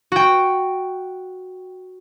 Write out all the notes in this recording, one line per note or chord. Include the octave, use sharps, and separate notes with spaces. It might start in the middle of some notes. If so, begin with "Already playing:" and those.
F#4 G5